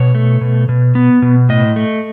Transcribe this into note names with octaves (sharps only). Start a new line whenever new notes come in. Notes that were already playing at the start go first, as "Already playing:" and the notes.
Already playing: B2 C#5
A3
B2
B2
B3
B2
A2 D#5
A3